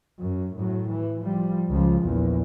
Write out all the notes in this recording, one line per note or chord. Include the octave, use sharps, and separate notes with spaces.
F#2
A2 F#3
E3
F3 G3
C#2 F3
A#1 E2